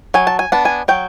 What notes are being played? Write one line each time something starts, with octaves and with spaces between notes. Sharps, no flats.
F#3 G#5
A5
G#5
B3 D4 A5
G#5
F#3 G5